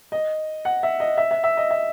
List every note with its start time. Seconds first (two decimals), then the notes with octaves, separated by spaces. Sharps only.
0.12 D#5
0.65 F#5
0.83 E5
1.00 D#5
1.17 E5
1.31 E5
1.44 E5
1.57 D#5
1.71 E5